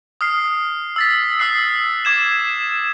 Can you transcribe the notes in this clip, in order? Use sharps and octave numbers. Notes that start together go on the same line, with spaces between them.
D#6 F6 C7
E6 A6 B6
D#6 E6 F#6 C7
D6 G#6 E7